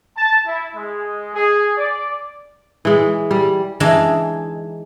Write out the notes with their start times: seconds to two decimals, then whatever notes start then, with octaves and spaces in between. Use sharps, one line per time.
0.16 A5
0.46 E4
0.75 G#3
1.35 G#4
1.76 D5
2.85 E3 G#3
3.31 G3
3.80 E3 G#3 D4 D#4 D#5